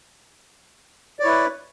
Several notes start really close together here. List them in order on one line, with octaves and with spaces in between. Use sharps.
D5 C#5 E4 B4